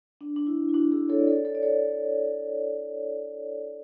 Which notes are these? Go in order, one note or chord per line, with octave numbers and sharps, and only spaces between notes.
D4
D4
E4
E4
D4 F#4
E4 G#4
A4 C#5
D5
A4 C#5
A4 C#5
D5
A4 C#5